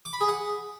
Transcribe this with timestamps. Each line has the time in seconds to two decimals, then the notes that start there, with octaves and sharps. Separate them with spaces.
0.05 D6
0.13 B5
0.21 G#4
0.28 F#5